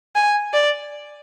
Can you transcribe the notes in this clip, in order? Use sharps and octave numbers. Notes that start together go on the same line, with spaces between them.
G#5
D5